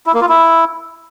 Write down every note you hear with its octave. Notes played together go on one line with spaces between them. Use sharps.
E4
A#3
F4
E4